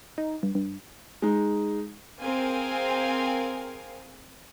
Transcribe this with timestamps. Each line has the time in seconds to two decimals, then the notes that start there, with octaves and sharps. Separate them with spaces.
0.18 D#4
0.43 G2
0.55 G2
1.22 G#3 D#4
2.20 C4 G#4 A#4 F5 G#5